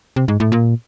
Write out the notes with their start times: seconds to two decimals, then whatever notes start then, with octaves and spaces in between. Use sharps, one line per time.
0.16 C3
0.28 G#2
0.40 A2
0.52 A#2